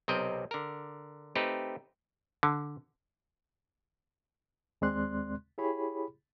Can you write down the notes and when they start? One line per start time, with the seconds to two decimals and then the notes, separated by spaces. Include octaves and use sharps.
0.08 B1 C3 C4 A#4 D#5 G5
0.51 D3 A#4
1.35 A3 C4 D#4 G4 B4
2.43 D3
4.81 D#2 G#3 C4 D5 C6 F#6
5.58 E4 G4 G#4 C#5 B5